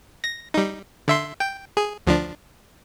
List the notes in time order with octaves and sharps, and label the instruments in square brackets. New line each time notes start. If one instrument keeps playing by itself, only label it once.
[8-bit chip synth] A#6
G3 D#4
D3 E5 C6
G5
G#4
D2 F3 D4